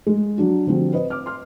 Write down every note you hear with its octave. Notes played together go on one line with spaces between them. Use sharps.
G#3
F#3 D4 F#4
D3 F3 G3 C4 F#4
B4 C5 D#5
D6 F6
C6 F6